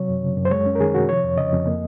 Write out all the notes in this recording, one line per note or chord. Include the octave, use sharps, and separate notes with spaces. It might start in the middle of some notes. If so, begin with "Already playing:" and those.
Already playing: C3 F#3 C#5
F#2
C#3
F#2
C5
G#3 C#5
C#4
A#4
D#3 G#4
C3 F#4
F3 C#5
F2
C#3 D#5
F2
A#3